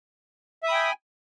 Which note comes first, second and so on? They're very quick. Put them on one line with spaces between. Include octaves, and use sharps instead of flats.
E5 D#6 B5 G5 G#5